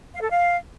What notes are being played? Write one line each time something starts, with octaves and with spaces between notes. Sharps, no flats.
F5
A4
F5